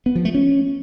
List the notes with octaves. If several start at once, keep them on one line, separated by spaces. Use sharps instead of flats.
B3
F3
A3
C#4